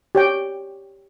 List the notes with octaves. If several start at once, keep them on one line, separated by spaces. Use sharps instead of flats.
G4 C#5 G5